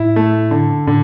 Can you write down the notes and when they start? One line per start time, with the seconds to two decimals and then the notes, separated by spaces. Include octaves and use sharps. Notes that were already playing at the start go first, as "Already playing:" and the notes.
Already playing: A2 E4
0.16 A3
0.51 D3
0.87 A2 D3